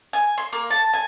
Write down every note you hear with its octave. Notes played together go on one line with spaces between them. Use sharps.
G#5
C6
A#3
A5
G#5